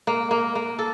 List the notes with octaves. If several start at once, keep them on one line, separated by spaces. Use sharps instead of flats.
A#3
A#3
A#3
A4